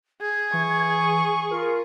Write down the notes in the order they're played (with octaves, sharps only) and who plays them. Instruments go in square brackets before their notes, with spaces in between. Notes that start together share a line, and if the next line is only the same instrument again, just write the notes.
[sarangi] G#4 [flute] G#6
[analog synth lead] E3 [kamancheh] C#6
[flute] G#5
[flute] F4 [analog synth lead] A#4